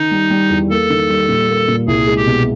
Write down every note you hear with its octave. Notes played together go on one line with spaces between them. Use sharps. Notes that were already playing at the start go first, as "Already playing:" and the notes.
Already playing: D#3 D#4
G3
G3
E2
A#3 A4
D#3
G3
A#2
A#3
A#2
C2 G#4
G#3
G4
B2